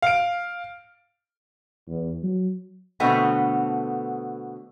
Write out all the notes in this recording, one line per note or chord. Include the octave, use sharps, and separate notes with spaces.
F5 D7
E2
F#3
B2 D3 A3 B3 C4